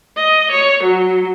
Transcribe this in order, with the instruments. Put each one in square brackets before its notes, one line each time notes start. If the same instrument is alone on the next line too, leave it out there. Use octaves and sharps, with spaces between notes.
[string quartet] D#5
C#5
F#3